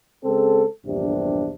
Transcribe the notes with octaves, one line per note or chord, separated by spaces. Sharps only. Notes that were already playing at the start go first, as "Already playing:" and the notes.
C#3 G#3 C4 A4
A#1 E2 G2 C3 D4